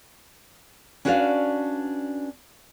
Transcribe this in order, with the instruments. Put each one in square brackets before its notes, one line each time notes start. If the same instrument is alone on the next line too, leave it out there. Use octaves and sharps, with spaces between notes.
[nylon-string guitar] C#4 D4 F#4 B4 D5 F5